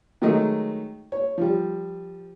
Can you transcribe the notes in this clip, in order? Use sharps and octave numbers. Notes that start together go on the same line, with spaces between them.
D#3 F#3 G#3 A3 D#5
C#5
F3 G3